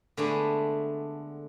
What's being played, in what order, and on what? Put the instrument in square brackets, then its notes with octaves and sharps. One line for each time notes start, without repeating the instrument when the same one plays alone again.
[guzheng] D3 G#3 A3 B3 D4